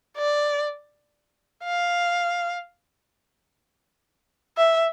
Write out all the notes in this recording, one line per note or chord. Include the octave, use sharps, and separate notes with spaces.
D5
F5
E5